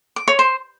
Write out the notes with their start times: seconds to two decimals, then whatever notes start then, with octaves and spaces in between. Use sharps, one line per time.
0.16 D6
0.28 C#5
0.39 C5